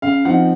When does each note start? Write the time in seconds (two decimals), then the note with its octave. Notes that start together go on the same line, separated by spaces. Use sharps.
0.02 C#3 F5
0.25 F3 C4 D#4 F#5